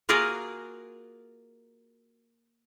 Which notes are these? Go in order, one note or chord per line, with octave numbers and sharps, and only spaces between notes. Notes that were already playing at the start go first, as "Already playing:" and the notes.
A#3 F4 F#4 G#4 A#4 F5